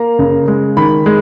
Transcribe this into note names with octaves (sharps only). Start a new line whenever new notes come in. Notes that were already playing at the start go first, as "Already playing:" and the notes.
Already playing: A#3 A#5
C#3
G#3
D#3 B5
G#3